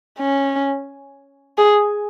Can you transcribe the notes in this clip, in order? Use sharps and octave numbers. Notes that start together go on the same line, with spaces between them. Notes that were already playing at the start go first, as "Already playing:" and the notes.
C#4
G#4